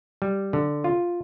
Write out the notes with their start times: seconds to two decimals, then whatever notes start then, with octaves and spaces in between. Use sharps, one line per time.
0.22 G3
0.53 D3
0.84 F4